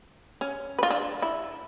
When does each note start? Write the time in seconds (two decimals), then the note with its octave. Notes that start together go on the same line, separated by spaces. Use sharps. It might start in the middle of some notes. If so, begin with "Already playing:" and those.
0.41 C#4
0.78 F4 B4
0.90 D4
1.22 E4